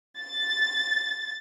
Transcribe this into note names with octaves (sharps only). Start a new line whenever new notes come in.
A6